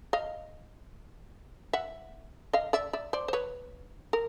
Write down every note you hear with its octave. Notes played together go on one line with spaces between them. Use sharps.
D#5 F5
E5 F#5
D#5 F5
D5 E5
D5 E5
C5 D5
C5
B4 C#5
A#4